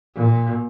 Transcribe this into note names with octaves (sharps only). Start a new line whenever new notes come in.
A#2